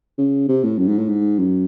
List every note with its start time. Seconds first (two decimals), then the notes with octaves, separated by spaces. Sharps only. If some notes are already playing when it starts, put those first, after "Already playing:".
0.18 C#3
0.48 C3
0.63 A2
0.78 F#2
0.88 G#2
0.98 A2
1.09 G#2
1.39 F#2